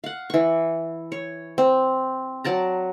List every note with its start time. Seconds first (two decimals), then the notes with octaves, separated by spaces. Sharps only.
0.04 F5 F#5
0.30 E3 C#6
1.12 C#5
1.58 C4
2.44 F#3 D5 A5 A#5